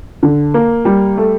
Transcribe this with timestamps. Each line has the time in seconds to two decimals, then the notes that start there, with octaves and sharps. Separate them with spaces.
0.23 D3
0.54 A#3
0.85 G3
1.17 A3